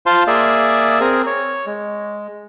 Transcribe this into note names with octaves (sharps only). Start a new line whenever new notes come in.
F4 C5 F5 A5 C6
A#3 G#4 D5 E5
C4 G#4 A#4
C#5
G#3